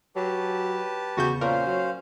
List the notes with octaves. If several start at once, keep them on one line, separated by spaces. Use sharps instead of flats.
F#3 G4 B4 A5
E2 C#3 F#4 G6
A#2 C#4 A#4 C5 F5
F#3